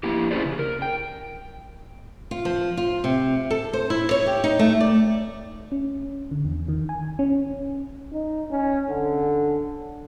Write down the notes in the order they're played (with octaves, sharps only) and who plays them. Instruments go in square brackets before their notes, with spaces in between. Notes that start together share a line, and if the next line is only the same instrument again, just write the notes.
[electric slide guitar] A#3 E4 G4
C#4 E4 G4 G#4 C5 D5
C#3
A#4
G5
[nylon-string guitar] F4
F3
F4
C3
A4
C5
E4
C#5
G4
D#4
A3
D5
[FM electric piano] C#4
D3
E2
D#3
G#5
C#4
[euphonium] D#4
C#4
D3